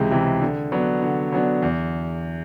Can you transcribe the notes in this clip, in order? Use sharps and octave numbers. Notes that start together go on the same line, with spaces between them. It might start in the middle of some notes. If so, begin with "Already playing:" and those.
Already playing: C#2 C3 E3 G#3
C3 E3 G#3
D3
F#3 B3 D4
D3
F#3 B3 D4
E2